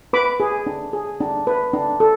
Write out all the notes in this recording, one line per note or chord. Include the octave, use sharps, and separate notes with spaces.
B4 B5 D6
G#4
D4
G#4
D4
B4
D4
A4